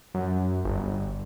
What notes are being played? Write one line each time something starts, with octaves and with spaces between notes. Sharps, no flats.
F#2
G1